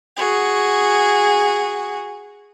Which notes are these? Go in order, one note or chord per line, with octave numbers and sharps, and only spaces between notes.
F#4 G#4